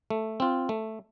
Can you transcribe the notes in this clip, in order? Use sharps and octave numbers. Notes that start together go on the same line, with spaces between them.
A3
C4 F4
A3